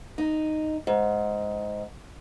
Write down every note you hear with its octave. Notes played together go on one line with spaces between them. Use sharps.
D#4
G#2